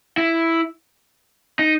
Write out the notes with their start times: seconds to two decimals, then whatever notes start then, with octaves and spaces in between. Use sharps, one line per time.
0.18 E4
1.59 D#4